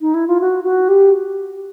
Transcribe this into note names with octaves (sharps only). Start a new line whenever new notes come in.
D#4
E4
F4
F#4
F#4
G4